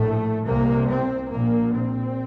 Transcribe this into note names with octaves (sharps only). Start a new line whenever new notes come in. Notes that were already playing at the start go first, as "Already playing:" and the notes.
Already playing: A#1 A2 A3
C2 C3 A#3
C4
A#1 A#2 A#3
C4